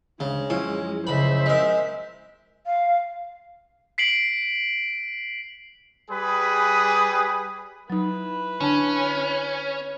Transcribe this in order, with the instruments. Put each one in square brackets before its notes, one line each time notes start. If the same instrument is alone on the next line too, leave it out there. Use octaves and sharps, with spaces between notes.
[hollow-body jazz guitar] D2 [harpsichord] C#3 [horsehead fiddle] G#3
[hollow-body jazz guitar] F#2 F3 E4 [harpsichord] C#4
[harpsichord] C#2 B5 [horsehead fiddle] C5 E5
[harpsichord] G#3 A#4
[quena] F5
[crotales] B6 C7 D7 F#7
[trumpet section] G3 G#4 B4 B5 D#6
[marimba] F#3 D#4 [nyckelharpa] E4 B4
[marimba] D3 D4 A5 [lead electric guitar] C#4